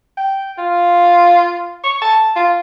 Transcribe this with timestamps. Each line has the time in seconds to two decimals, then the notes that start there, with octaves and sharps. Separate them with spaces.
0.17 G5
0.58 F4
1.84 C#6
2.02 A5
2.36 F4